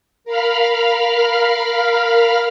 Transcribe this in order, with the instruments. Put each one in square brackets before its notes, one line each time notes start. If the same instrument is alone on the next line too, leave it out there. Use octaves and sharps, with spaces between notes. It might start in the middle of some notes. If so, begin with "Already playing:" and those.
[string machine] A#4 F5 B5 F6